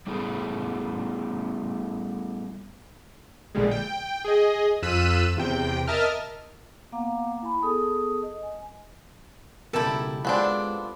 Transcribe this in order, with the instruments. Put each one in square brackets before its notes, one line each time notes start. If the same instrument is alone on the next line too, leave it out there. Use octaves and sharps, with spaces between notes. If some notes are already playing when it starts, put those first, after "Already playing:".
[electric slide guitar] G3 A3 B3 E4 G#4
[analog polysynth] A#1 D3 G3 G#3
G5
G#4 D#5
F2 F4 E6 F#6 B6 D#7
E2 C3 G5
A#4 D#5 E5 A5 F6
[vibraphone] A#3 B3 F5 F#5 A#5 D6
E4 G#5 B5
B3 G#4 A4 A5 D#6
D#5
G#5
[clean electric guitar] C#2 B2 [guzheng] E4 G4 A4 [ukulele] A#4 D5 A5
[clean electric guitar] G#3 F4 [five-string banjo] B3 C4 D4